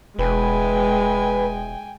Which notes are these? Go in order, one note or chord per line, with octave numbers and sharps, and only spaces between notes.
E1 G#3 B4 G5 G#5